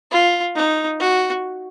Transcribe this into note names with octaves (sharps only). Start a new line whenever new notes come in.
F4
D#4
F#4